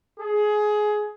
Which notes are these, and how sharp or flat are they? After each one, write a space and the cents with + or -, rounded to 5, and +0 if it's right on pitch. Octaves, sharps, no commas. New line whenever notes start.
G#4 +20